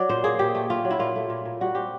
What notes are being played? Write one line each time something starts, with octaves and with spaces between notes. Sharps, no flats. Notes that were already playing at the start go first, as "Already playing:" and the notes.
Already playing: F#3 D5
A#2 C5
A#3 G#4
A#2 G4
A3
A3 F4
F#3
E4
A#2 F4
A3
A#2
A#2
G3 F#4
C4 G4